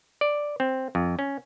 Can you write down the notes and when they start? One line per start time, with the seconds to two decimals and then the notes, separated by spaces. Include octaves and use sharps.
0.21 D5
0.60 C4
0.95 F2
1.19 C#4